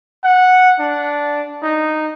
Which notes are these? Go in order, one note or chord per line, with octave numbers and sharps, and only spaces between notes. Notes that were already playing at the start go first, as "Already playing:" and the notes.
F#5
D4
D#4